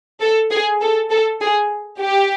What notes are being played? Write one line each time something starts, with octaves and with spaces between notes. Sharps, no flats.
A4
G#4
A4
A4
G#4
G4